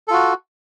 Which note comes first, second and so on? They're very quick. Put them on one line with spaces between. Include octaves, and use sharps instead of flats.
A4 F4 F#4